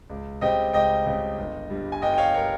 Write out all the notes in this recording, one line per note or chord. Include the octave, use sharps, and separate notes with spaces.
C#2
C#3 G3 C4 D#5 G5
C#2 D#5 G5
C#3 G3 C4
G1
G2 G3
G#5
G1 D#5 G5
G5
C#5 F5
G3 A#4 C#5